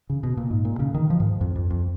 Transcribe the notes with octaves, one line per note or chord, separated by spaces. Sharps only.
C#3
B2
A#2
G#2
A#2
C#3
D#3
F3
G#2
F2
F2
F2